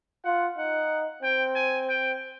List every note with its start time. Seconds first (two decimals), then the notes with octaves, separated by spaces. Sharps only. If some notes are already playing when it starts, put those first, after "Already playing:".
0.24 F4 F#5
0.58 D#4 F#5
1.23 C4 G5
1.56 G#5
1.89 G5